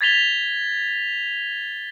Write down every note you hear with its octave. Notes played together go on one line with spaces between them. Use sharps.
G#6 A6 B6 F7 G7